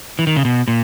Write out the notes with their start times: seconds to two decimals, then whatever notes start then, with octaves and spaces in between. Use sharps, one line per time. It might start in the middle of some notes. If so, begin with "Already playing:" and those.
0.19 E3
0.27 D#3
0.36 C#3
0.45 B2
0.68 A#2